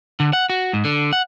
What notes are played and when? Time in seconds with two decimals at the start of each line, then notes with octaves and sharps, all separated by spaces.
0.20 D3
0.33 F#5
0.50 F#4
0.73 G#2
0.85 D3
1.13 F#5